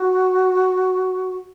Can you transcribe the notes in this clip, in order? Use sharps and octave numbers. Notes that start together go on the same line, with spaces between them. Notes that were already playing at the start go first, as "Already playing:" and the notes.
Already playing: F#4